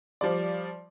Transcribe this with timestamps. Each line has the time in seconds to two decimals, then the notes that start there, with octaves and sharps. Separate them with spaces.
0.21 F3 G3 D5